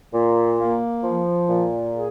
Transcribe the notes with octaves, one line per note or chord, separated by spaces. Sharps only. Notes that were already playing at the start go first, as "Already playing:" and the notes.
A#2
A#3
F3
A#2
G#4